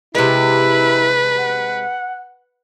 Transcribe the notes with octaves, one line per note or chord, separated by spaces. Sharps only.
C3 G#3 E4 B4
F#5